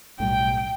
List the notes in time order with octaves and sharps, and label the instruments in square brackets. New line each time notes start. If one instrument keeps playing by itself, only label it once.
[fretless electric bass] B1 A2 G3 [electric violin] G5